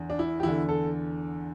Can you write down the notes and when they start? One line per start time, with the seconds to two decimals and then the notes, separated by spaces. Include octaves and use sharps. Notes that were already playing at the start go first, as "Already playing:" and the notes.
Already playing: E2 D3
0.10 D4
0.19 E4
0.40 G4
0.43 E2 D3 E4
0.69 A4